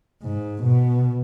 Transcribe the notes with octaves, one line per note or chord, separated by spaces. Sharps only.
G#2
B2